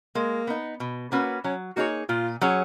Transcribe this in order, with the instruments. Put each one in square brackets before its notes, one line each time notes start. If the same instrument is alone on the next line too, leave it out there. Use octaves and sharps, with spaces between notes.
[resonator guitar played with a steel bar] G#3 [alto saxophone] A#3
[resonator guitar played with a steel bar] B3 D#4
B2
A#3 C#4 F#4 B4
[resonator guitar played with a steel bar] F#3 [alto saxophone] C#4
[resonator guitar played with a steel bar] A#3 D#4 G#4 C#5 [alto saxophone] F#4
[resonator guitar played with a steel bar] A#2 [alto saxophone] F4
[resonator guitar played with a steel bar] F#3 C#4 G#4 C#5